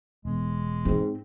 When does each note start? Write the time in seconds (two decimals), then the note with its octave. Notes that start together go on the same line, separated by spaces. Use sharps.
0.25 E1 G#3 B3
0.85 G#2 C4